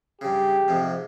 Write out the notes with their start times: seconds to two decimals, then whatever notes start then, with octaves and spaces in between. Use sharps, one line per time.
0.21 G2 C#3 G4
0.68 F2 G#2 C3